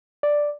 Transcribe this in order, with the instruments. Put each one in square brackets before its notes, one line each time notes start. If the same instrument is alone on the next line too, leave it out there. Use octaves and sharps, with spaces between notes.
[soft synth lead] D5